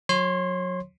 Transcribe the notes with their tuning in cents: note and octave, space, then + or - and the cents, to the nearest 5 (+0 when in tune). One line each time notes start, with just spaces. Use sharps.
F#3 -30 C#5 -30 C6 +0